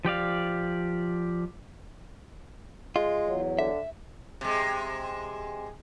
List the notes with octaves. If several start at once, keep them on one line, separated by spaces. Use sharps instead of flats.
F3 G4 D5 F5
G#3 F4
E2 F#3
D3 E5
C3 G#3